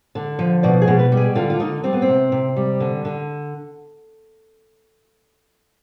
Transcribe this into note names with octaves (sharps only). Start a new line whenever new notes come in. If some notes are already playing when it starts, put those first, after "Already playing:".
D3
F3
B2 D5
G#4
B2
B4
G3
G#4
D3 F4
F4
D3 D#4
G3 C4
B3
C4
C3
C3
G3
D3
D3